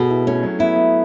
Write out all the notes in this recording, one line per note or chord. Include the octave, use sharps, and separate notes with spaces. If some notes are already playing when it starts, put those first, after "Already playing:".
Already playing: B2 G#4 A4
E4
A3 C#4
F#3
B3 E4
B3